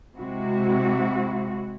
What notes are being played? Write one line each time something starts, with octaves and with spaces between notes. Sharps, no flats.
C3 G#3 E4 F#4